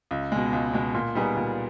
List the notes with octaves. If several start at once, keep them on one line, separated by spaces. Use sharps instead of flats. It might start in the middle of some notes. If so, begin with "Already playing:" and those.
C#2
B2 G#3
C#2
B2 G#3
A#2
G3 B3 D#4 G#4
A#2